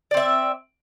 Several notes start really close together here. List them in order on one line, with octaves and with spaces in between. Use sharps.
D5 C4 E5